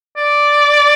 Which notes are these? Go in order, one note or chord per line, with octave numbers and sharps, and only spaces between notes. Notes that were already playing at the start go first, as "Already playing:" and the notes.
D5